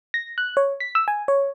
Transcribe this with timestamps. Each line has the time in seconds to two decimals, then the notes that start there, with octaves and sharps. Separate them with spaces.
0.14 A#6
0.38 F#6
0.57 C#5
0.80 B6
0.95 E6
1.08 G#5
1.28 C#5